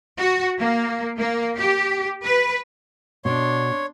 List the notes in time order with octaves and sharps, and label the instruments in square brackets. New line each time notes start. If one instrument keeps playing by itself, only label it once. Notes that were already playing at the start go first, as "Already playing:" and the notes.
[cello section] F#4
A#3
A#3
G4
B4
[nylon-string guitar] B2 [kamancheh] D4 C6 [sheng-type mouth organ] C#5